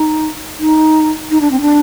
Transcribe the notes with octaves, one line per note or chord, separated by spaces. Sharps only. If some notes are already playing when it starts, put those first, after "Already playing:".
Already playing: D#4
D#4
D#4
D4
C4
D4